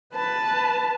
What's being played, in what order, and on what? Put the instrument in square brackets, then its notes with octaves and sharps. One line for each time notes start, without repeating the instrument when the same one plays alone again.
[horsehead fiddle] B4 A5